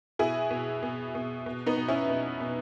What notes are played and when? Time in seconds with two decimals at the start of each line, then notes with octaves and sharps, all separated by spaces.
0.19 B2 E4 G#4
0.50 B2
0.83 B2
1.15 B2
1.46 B2
1.66 B3 D#4
1.77 B2
1.88 C#4 E4
2.09 B2
2.40 B2